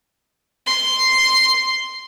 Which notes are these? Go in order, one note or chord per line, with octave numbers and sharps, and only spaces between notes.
C6 C7